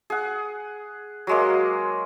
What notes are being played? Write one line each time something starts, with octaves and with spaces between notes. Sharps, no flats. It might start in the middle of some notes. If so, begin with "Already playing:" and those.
G#4 F#5
F#3 G#3 A#3